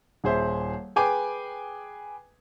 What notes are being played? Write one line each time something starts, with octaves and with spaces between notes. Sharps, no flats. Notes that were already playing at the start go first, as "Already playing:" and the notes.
D#1 G#4 C5 E5
G#4 B4 G5 G#5 D6